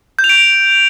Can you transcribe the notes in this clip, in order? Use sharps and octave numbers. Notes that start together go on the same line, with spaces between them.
G6
F7
D7